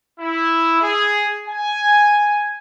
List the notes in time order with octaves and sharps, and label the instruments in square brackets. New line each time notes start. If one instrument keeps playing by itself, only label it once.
[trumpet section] E4
G#4
G#5